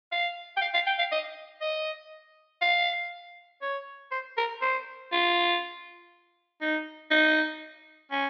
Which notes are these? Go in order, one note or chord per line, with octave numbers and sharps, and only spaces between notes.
F5
G5
F5
F5
G5
F5
D#5
D#5
F5
C#5
C5
A#4
C5
F4
D#4
D#4
C#4